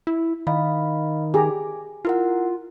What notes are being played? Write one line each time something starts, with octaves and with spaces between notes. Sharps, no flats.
E4
D#3 D#5 F5 B5
G4 G#4 G#5 A#5 D6
E4 F4 A#4 F#5